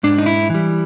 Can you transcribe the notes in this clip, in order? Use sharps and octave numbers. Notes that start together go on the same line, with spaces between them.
G#2 D4
D#4
E4
E3 G3